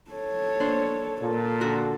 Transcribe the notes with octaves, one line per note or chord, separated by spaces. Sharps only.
A4 C#5
A#3 D4 C5
A#2 A4
D3 F#4 A#4